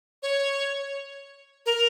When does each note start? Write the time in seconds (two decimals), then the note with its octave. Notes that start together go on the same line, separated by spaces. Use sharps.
0.23 C#5
1.66 A#4